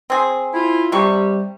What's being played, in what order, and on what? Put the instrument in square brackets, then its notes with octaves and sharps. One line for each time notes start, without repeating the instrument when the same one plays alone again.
[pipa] C4 G#4
[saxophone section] E4 F4
[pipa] C3 C#6 [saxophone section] G3